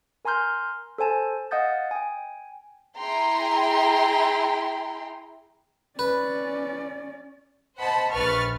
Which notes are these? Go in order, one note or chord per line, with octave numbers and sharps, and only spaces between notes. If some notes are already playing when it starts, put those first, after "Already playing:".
A#4 G#5 A#5 C6 F6 G6
A4 C5 G#5 A5
D#5 F5 F#5 D#6 G6 A6
G5 G#5
E4 G#4 G5 A#5 C6
C#4 B4 D5
C5 D#5 F#5 A5 B5
A#1 B4 C#6 F6 A6